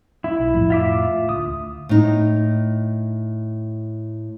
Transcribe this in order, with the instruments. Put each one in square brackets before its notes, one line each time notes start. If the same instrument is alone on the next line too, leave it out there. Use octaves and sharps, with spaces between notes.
[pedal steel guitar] E4
[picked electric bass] B1
F2 A2 F3
[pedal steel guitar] F4 E5 D6
[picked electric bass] D2 [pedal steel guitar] D#6
[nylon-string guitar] A2 D#4